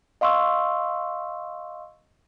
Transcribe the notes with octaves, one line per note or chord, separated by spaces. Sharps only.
D#5 F5 C6 C#6 E6